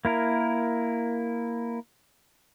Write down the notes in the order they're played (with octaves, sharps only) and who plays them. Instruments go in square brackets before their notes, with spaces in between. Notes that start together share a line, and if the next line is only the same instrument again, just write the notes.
[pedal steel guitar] A#3 E4 A#4